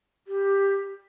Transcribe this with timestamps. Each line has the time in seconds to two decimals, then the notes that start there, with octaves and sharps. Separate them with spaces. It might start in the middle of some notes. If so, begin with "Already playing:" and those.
0.28 G4